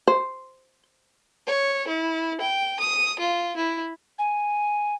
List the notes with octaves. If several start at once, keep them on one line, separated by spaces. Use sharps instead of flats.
C5
C#5
E4
G5
D#6
F4
E4
G#5